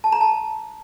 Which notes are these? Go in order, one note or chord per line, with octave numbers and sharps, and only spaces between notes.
A5
A#5
A5